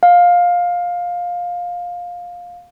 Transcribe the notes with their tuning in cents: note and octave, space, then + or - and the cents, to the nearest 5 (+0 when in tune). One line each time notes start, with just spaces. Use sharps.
F5 +15